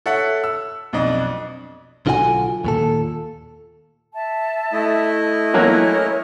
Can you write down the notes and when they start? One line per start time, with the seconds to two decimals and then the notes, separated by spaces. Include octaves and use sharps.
0.06 A4 C#5 E5 F#5
0.44 E6
0.93 B1 F2 D4 D#5
2.06 B1 D3 F4 F#4 D#5 G#5
2.64 D#2 A#2 A4
4.13 E5 A5
4.73 A3 E4 D#5
5.54 E3 F#3 A#3 C#4 A#4 C#5